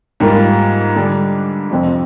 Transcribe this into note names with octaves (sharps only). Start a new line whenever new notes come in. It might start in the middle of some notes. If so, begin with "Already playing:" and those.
G#2 G3 A#3 F4
D3 G3 D4
F2 C3 F3 C4